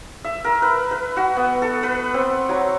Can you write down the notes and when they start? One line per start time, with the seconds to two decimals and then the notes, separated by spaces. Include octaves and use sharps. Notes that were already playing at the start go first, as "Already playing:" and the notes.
0.24 E5
0.45 A#4
0.62 B4
0.91 B4
1.17 F#4
1.37 B3
1.62 A4
1.83 B4
2.14 C4
2.49 F#3